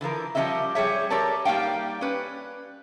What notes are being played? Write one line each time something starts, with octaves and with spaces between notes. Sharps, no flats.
D3 E3 F3 A#4
F3 G3 B3 C#4 D#5 E5
G3 G#4 C#5 E5
G4 A4 A#4 C#5 D5 A5
G3 A#3 D#4 F5 G5
C#4 B4